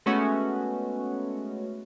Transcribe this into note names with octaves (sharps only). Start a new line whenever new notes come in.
G#3 A3 B3 C#4 F#4